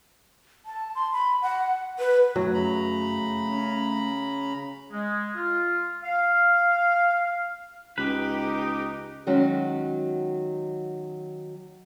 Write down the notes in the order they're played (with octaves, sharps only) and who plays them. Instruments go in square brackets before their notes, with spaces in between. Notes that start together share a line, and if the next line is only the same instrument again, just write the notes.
[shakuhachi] A5
C6
B5
F#5
B4
[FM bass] F#2 [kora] F#3 [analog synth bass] A3
[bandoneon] C#3 A#5 B5
[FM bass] C#4
[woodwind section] G#3
F4
F5
[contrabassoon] C#2 [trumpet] D#4 [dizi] G4 [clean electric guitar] B4
[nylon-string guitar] D#3 F#3 G#3 C#4 F#4